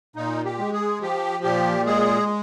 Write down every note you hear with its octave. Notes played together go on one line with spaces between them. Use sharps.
A#2 D#4
G4
G#3
G#4
F3 G4
A#2 G4
G#3 G#4